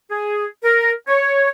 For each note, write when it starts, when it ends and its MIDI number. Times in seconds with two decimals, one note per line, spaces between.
0.11 0.45 68
0.64 0.92 70
1.08 1.50 73